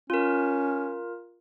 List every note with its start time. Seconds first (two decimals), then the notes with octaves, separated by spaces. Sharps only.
0.10 C#4 F4 A#4